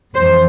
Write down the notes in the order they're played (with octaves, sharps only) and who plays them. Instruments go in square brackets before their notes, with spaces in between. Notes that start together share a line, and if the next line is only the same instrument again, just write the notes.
[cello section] F2 E3 C5